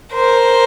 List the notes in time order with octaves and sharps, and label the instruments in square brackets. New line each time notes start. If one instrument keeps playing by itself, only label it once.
[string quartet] A#4 C5